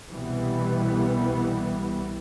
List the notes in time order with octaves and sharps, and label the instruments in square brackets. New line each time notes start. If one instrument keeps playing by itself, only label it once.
[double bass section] C2 B2 E3 G3 B3